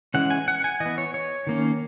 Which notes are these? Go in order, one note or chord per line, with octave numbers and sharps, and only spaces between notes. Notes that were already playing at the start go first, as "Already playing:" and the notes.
E3 G#3 C#4 F#5
G#5
F#5
G#5
E3 D#5
B3
C#5
C#5
D#3 A#3 C#4